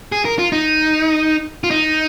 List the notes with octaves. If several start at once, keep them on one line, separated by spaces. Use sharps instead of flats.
G#4
A#4
F4
D#4
F4
D#4